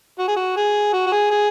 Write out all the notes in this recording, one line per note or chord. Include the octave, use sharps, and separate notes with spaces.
F#4
G#4
F#4
G#4
F#4
F#4
G#4
G#4